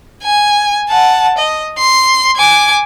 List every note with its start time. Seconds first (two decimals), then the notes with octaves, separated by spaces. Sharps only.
0.23 G#5
0.89 F#5 A5
1.38 D#5
1.78 C6
2.36 G#5 D6